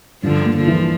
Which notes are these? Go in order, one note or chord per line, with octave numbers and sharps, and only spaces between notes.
G2 D3 F3
A#3
D3 F3
E3